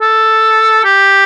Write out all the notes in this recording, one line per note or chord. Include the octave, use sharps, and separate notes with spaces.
A4
G4